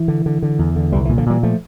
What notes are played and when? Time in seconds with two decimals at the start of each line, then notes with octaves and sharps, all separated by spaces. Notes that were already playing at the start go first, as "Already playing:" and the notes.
Already playing: E3
0.08 D3
0.26 D3
0.43 D3
0.59 E2
0.76 D3
0.92 C2 E3 G3
1.05 A#2 E3
1.17 D3 F3
1.26 A#2 E3 G3
1.43 F3 A3